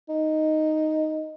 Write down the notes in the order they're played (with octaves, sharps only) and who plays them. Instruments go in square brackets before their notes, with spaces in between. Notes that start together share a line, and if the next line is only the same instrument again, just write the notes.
[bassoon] D#4